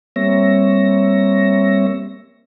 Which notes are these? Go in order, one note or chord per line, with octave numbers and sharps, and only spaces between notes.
G3 A#3 C4 C#5 E5 A#6